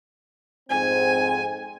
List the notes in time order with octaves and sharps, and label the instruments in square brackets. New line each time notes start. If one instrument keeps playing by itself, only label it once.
[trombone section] F2 G#2 C4 [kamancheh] G#5